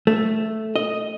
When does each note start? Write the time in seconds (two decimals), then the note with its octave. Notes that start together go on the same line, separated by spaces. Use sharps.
0.07 A3
0.76 D#5